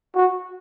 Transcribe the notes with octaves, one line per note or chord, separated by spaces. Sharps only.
F#4